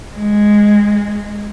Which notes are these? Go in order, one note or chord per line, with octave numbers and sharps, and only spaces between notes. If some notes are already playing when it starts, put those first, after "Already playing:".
G#3